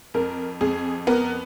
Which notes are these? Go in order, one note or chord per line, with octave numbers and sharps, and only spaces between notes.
F2 A#4
F2 G#4
B3 A#4